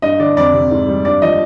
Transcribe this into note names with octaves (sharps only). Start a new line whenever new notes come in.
G2 D#5
D3 D5
F2 D5
C3
G#2
G3
G2 D5
F3 D#5